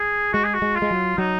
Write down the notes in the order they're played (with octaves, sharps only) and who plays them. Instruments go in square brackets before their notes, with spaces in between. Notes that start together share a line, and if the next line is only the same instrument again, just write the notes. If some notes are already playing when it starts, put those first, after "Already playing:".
Already playing: [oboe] G#4
[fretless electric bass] G#3 [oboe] F#4
[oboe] G#4
F#4
[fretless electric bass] G#3
[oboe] F4
[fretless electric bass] G#3
F#3
[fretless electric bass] F#3 [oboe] D#4